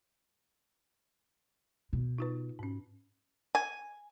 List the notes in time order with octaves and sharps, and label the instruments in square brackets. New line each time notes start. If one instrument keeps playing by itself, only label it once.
[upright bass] B2
[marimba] D#4 F4 B4
G#2 C#4
[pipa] G#5